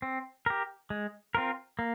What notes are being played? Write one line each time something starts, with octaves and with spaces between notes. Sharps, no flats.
C4
G4 A#4
G#3
C4 F4 A#4
A#3